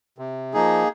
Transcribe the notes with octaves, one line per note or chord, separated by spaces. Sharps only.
C3
F3 A#3 D#4 G#4